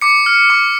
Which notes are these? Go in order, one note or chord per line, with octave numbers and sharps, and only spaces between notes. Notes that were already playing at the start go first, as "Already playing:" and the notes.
D6 C#7
F6
D6